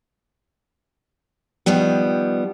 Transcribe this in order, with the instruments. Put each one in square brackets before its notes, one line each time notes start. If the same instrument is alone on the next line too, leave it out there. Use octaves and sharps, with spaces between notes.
[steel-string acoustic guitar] D#3 F3 G3 B3